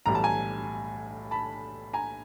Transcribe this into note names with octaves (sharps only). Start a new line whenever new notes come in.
B1 A2 E3 G3 A#5
A5
G#5 A#5
A5 B5
G#5 A#5